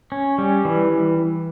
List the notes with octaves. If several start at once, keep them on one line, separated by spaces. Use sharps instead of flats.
C#4
G3
E3